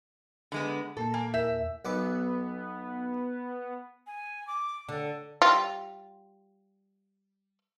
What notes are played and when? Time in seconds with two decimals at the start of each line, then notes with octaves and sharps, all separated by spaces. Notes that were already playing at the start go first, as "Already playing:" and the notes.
0.52 D3 G#3 B3
0.97 A#2 A#3 A4 A5
1.14 A#3 G#5
1.34 E2 A#4 E5 G6
1.85 B1 B3 B4 D6
4.07 G#5
4.47 D6
4.89 D3 A4
5.42 G3 F4